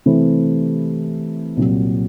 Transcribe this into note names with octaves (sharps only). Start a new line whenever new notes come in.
C3 E3 A3 C4 E4
C2 A#2 F#3